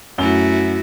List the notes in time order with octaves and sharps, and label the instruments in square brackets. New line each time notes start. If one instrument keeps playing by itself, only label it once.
[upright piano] F#2 G7 [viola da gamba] A3 E4 F#4